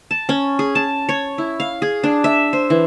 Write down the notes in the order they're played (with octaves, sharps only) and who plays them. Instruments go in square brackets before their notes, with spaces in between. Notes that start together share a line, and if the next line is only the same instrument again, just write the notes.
[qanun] A5
C#4
G#4
A5
C#5
E4
F5
G#4
D4
E5
C5
E3